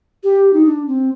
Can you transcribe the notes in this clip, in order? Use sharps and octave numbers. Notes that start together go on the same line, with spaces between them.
G4
D#4
D4
C4